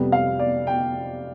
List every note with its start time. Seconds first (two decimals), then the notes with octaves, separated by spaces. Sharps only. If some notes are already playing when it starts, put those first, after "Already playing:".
Already playing: F2 C3 G3 B3
0.12 F5
0.39 D5
0.67 G5